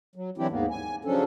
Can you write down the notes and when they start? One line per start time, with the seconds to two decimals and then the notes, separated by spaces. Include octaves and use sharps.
0.15 F#3
0.38 E3 F#3 C4 D4 E4 G4
0.50 D#2 G#2 A#3 B3
0.70 G#5
1.05 C#3 F3 F#3 C#4 D4 A4